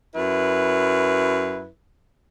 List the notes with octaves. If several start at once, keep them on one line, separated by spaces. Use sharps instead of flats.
F#2 E4 B4